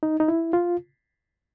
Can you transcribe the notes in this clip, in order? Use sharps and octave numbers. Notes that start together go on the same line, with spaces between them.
D#4
D#4
E4
F4